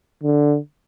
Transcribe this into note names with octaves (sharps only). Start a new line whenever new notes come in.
D3